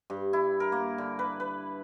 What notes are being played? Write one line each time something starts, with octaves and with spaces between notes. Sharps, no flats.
G2
E4
A#4
A#3
D3
B4
B4